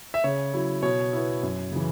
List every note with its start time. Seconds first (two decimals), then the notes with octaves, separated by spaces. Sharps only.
0.14 E5
0.24 C#3 C#5
0.53 F#3 E4
0.82 B2 C#5
1.13 B3 E4
1.43 F#2
1.72 C#3 E3